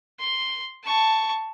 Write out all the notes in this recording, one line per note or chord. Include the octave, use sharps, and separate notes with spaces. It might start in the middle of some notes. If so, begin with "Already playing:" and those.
C6
A5 C#6